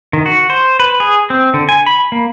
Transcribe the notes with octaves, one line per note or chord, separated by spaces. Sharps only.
D#3
F#4
C5
B4
G#4
C4
D3
G#5
B5
A#3